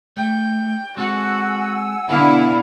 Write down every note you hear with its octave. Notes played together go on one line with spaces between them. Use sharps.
A3 G5
G#3 C4 F#4 A4 F#5 G#5 E6
B2 D3 E4 B4 F5